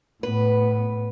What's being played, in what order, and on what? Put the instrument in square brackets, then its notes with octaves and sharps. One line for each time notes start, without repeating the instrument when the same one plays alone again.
[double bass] A2 B3 [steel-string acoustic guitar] B4